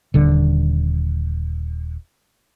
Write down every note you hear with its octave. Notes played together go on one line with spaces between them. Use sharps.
D#1 D3